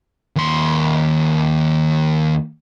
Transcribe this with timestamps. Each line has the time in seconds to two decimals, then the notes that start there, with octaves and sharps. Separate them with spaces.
0.36 D#2 C6